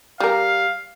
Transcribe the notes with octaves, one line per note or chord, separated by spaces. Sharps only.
G3 A#4 F5